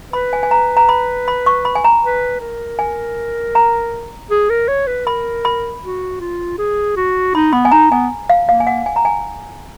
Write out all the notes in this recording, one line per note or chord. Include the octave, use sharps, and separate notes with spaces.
B4 B5
G#5
G#5
A#5
A#5
B5
B5
C#6
B5
G#5
A#5
B4
A#4
G#5
A#5
G#4
A#4
C#5
B4
A#4 B5
B5
F#4
F4
G#4
F#4
D#4 B5
B3 B5
G#5
D#4 A#5
B3 G#5
F5
A#3 F5
G#5
F#5
G#5
A#5
G#5